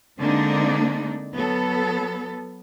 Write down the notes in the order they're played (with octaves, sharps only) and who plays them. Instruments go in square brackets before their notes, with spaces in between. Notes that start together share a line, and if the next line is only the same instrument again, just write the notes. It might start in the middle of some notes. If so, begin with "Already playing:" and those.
[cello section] D3 G#3 A#3 C4 D4 D#4
F#3 B3 A4